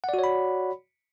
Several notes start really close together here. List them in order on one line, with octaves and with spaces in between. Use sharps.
F#5 D5 F#4 C#5 B5